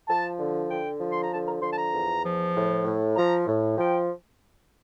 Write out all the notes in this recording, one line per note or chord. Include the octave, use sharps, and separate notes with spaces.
F3 A5
D3
D3 G5
F3
C6
A#5
D3 A5
A#5
F3 C6
A5
A#5
E2
F3
A2
A2
F3 A#5
A2
F3 G5